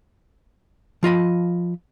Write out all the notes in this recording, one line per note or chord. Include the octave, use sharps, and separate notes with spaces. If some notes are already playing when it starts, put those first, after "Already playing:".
F3 F4 D#5 B5